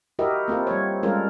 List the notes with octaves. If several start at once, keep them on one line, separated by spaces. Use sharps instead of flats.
E4 F#4 G4 A#4 D#5 E5
A#3 C4 F4 A4
G3 C#5
G3 G#3 C#4 F4 A4 A#4